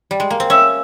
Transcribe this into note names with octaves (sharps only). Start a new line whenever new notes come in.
G3
G#3
A#3
C4
C#4 E5